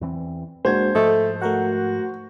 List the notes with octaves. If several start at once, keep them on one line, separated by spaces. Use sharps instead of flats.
E2 E3 C4
E1 G#3 A#3 D4 F#4 C5 G#6
G#2 F3 A3 D#5
A3 F#4 A#4 F#5